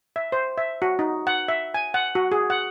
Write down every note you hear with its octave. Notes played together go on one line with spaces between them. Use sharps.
E5
C5
E5
F#4
D#4
F#5
E5
G#5
F#5
F#4
G#4
F#5